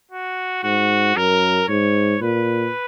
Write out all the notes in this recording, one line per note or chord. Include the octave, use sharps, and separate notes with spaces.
F#4
G#2 F#4
F#2 A#4
G#2 C#5
A#2 B4